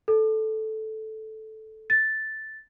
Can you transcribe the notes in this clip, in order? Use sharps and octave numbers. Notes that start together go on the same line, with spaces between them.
A4
A6